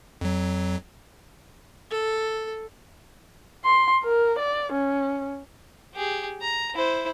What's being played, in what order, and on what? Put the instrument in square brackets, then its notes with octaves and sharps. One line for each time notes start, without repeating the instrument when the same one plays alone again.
[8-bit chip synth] F2 F#3
[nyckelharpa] A4
[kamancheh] C6
A#4
D5
C#4
[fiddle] G4 G#4
A#5
E4 C5